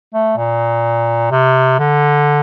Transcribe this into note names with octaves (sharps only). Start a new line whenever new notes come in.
A3
A#2
C3
D3